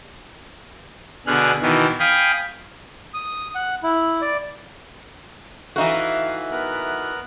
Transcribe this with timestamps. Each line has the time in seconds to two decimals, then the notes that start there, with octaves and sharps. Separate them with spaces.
1.26 B2 D3 G#4 F6 F#6
1.62 B2 D#3 E3
2.00 F5 G5 G#5 B5 D#6
3.14 D#6
3.55 F#5
3.83 E4
4.22 D5
5.76 E3 D#4 F#4 A4 E5 F5
6.51 B3 A#4 F#6